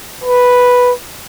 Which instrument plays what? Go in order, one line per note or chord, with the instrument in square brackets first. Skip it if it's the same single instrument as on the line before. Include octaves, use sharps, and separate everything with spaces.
[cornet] B4